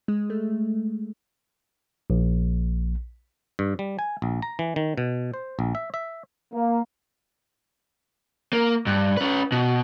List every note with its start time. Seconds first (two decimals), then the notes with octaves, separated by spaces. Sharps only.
0.08 G#3
0.30 A3
2.10 A#1
3.59 G2
3.79 G3
3.99 G#5
4.22 A#1
4.42 A#5
4.59 E3
4.76 D#3
4.98 B2
5.34 C5
5.59 A#1
5.75 E5
5.94 E5
6.52 A#3
8.53 A#3
8.87 G2
9.17 C#4 B4
9.52 B2